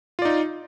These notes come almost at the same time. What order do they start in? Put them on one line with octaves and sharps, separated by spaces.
F4 D5 D#4